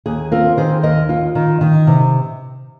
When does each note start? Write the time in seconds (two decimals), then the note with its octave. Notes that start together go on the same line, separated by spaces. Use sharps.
0.06 D#2 G#4
0.31 C4 F4 A#4
0.57 D#3 G#4 C5
0.83 D#2 A#4 D#5
1.09 F4
1.35 D#3
1.61 D#3
1.87 C3